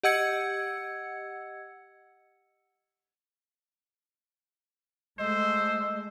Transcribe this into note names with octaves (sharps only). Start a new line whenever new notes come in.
G4 D#5 F#5 E6 G#6 C#7
G#3 A3 C5 D#5 E6